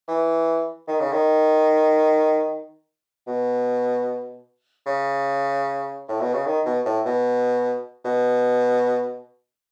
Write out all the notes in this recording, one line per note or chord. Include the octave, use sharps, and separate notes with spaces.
E3
D#3
C#3
D#3
B2
C#3
A2
B2
C#3
D#3
B2
A2
B2
B2